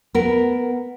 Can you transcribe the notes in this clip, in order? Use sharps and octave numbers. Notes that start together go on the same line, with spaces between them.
B3 A#4